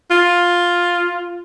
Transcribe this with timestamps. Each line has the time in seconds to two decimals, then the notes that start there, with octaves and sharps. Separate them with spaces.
0.11 F4